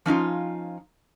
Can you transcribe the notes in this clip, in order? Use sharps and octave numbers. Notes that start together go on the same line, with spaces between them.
F3 C#4 D#4 F4